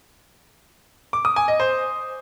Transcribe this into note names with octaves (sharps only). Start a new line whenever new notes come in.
D6
D#6
G#5
D#5
C5